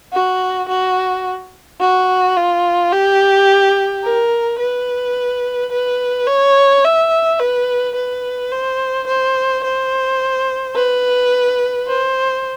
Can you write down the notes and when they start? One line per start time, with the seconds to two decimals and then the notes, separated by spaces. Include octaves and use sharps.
0.13 F#4
0.68 F#4
1.80 F#4
2.37 F4
2.92 G4
4.04 A#4
4.59 B4
5.72 B4
6.27 C#5
6.84 E5
7.40 B4
7.95 B4
8.52 C5
9.07 C5
9.64 C5
10.75 B4
11.87 C5